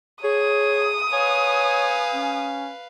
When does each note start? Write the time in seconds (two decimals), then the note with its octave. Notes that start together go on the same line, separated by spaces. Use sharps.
0.24 G#4 C#5 D#6
1.13 B4 C#5 F5 G#5
2.14 C#4